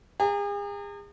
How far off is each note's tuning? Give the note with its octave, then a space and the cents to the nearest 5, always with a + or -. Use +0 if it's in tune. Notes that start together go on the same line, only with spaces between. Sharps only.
G#4 -40 A#5 -45